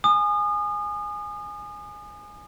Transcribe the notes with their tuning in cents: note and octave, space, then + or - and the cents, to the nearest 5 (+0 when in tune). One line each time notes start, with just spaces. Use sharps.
G#5 +0 D#6 -35